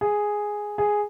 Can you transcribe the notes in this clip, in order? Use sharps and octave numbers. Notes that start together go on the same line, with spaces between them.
G#4
G#4